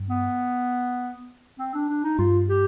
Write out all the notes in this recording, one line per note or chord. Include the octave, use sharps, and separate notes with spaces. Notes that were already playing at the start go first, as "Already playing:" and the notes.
Already playing: G2
B3
C4
D4
D4
D#4
G2 F4
G4